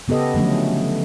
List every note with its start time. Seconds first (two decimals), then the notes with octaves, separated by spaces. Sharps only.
0.08 C#3 B3 G4 A4 D#5
0.34 D3 F3 F#3 A3 C#4